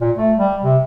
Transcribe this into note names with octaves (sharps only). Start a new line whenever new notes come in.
A#2
A3
G3
C3